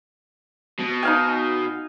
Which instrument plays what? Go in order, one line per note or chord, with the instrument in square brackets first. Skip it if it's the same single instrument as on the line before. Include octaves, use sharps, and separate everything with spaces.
[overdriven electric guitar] B2
[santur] D#4 F5 G#5